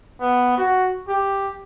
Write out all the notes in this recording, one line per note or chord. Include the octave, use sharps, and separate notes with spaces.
B3
F#4
G4